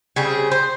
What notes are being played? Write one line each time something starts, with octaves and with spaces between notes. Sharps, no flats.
C#3 G3 C4 G#4
C5